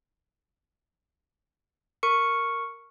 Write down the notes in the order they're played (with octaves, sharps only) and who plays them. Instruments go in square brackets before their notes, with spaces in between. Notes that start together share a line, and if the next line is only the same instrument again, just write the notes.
[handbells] A#4 C#6 C#7